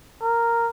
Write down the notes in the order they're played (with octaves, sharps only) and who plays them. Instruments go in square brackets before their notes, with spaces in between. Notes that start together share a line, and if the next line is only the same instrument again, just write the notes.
[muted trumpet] A#4